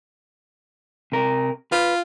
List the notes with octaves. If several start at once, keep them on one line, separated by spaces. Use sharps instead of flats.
C3 A#4
F4 B4